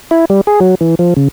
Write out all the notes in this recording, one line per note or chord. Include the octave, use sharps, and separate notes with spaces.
E4
G3
G#4
F#3
E3
F3
C#3